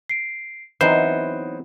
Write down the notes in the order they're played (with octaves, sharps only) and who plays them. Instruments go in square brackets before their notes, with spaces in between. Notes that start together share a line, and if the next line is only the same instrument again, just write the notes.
[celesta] C7 D7
[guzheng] E3 B3 C4 [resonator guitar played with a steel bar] F#3 D#4 [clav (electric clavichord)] C5 [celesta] B5